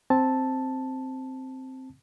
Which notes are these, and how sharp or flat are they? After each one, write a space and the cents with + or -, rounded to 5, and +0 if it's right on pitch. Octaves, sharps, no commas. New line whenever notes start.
C4 +0 A5 +0